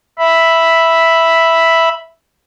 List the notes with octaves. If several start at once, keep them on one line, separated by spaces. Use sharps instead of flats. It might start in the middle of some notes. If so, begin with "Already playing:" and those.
E5 B5